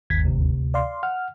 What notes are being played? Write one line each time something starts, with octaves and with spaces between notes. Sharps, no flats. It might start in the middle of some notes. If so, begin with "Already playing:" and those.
G1 D#2 G#6 B6
D2 C3
D5 F5 C6
F#5 F6